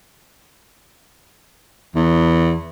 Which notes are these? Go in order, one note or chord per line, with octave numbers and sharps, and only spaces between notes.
E2